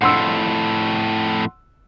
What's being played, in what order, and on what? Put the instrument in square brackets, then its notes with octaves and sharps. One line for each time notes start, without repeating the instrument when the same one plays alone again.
[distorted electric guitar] F2 A2 [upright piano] F#5 C6 E6